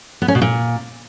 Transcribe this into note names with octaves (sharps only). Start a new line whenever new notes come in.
B3
C#4
B2
A#2